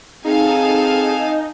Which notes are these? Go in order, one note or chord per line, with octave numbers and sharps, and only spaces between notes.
C4 D#4 G#4 A4 F5 G#5